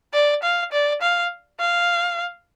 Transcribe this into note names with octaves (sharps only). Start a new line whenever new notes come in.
D5
F5
D5
F5
F5